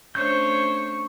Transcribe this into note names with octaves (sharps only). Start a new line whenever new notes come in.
A3 C#4 D4 C5 C#5 C#6 G6